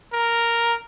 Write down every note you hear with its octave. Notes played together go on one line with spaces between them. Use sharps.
A#4